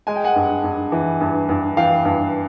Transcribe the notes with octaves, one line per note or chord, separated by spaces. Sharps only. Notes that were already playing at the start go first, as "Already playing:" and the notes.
G#3 G#5
G5
F#5 G#5
G2
G2
E3
G2
G2
E3 F5 G5
G2